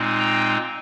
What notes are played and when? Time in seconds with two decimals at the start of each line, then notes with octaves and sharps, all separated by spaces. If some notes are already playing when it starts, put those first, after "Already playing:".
Already playing: A#2 G#3 C4 D#4
0.19 G5 A#5